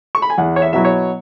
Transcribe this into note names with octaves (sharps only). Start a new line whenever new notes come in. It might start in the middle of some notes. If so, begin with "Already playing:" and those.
C#6
B5
G#5
E2 F#5
C#5
E5
B2 F#3 E4 E5
C#5